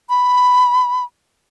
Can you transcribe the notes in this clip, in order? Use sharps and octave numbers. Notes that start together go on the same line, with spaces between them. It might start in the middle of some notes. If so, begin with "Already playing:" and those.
B5